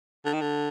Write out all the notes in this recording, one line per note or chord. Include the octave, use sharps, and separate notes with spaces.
D3
D#3
D3